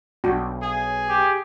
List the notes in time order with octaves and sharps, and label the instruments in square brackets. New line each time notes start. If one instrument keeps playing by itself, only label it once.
[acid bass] B1 [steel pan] D4 F#4 G5
[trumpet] G#4
[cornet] G4